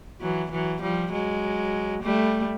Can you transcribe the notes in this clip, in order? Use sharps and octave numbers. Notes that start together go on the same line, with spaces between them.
E3 F#3
E3 F#3
F3 G3
F#3 G#3
G3 A3